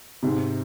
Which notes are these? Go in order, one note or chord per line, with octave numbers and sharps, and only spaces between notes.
G#2 C3